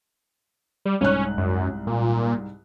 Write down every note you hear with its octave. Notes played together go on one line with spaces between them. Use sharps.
G3
C2 G#2 C#4 F#6
F#2
A#2